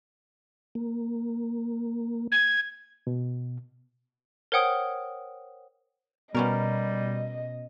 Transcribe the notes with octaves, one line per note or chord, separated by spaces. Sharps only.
A#3
G#6
B2
A#4 C5 C#5 F#5 G5 D#6
B2 G3 B3 C#4 A#4 D#5